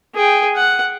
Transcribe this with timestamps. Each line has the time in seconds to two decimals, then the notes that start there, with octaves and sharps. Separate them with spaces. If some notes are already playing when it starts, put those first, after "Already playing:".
0.15 G#4 G5
0.55 F#5